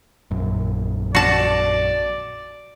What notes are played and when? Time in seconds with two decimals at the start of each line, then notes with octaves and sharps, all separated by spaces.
0.31 A#1 F#2
1.15 F#4 D5 A5